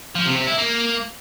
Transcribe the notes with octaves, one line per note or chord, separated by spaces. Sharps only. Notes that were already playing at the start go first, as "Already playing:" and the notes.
F3
C3
C3
E4
A#3